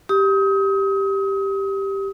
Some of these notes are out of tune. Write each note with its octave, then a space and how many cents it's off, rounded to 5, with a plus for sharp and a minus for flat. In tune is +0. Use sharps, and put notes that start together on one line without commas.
G4 +0 D#6 +35